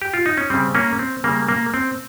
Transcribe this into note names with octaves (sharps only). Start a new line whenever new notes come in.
G4
F4
D#4
C#4
C#3 G3 C4
A#3 C#4
C4
C#3 G3 A#3
A#3
C4